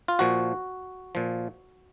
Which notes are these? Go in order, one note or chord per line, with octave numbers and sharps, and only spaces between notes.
F4
A#2 F3 F#4
A#2 F3